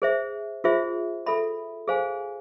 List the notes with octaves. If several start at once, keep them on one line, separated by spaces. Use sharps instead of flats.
G#4 C5 E5
F4 G#4 C5 E5
A4 E5 B5
G#4 C5 F5 G#5